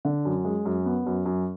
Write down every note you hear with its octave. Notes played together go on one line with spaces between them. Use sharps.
D3
F#2
G#3
F#2
B3
F#2
F#2